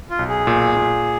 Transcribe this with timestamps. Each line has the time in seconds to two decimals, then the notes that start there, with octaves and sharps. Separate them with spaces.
0.10 F4
0.19 B1
0.29 G#4
0.47 A#2
0.76 A#2